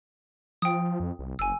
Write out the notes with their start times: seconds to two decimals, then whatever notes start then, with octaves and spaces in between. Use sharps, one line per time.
0.62 F3 G5 D#6
1.00 F2
1.19 C2
1.39 F#1 G#5 E6